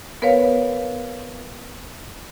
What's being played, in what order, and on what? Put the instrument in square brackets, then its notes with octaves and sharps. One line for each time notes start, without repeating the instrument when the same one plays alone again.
[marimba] B3 A#4 B4 C#5 F5